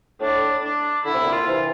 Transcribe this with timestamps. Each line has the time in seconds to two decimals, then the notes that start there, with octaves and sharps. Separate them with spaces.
0.21 A2 D4
0.63 D4
1.04 D3 E4
1.14 C3
1.24 A#2 D3
1.32 F4
1.46 C3 E3